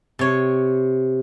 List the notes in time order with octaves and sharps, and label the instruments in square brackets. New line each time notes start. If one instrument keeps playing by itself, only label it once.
[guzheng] C3 C#5